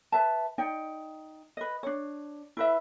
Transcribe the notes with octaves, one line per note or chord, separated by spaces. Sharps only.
B4 E5 A5
D#4 D5 G5
B4 D#5
D4 C#5
E4 B4 E5